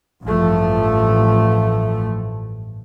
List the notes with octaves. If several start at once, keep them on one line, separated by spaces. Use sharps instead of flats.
A1 G2 F3 A3